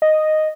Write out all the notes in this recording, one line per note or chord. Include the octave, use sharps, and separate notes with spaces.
D#5